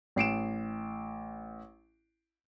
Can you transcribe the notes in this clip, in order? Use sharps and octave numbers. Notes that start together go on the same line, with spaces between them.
A1 C7 D7 E7